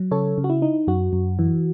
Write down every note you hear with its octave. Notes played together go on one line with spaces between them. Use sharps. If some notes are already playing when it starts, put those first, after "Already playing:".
Already playing: F#3
C#3 A4 C#5
C#3
F#4
E4
D#4
F#2 F#4
F#2
E3